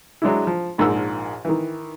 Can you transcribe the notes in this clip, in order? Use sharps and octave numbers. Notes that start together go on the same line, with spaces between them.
F#3 G#3 D4 E4
F3
A#1 G#2 F3 A#4 E6
D#3 E3